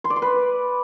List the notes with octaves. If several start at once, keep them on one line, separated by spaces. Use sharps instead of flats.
C6
D5
C6
B4